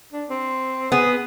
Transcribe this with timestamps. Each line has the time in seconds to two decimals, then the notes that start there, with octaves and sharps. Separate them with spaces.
0.13 D4
0.30 C4
0.92 B3 G#4